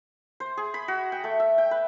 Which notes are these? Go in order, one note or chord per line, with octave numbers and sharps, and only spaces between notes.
C5
G#4
B5
F#4
G5
A3
E5
G5
B4